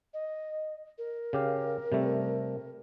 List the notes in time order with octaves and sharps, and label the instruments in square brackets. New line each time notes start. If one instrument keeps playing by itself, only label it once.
[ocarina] D#5
A#4
[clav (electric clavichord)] C#3 G4 F5
C3 G3 A3